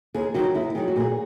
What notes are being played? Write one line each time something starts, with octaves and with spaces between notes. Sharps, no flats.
D#2 G#4
D#3 F#3 F#4
D#2 E4
D#3 F#3 G#4
F#4
A#2 G#4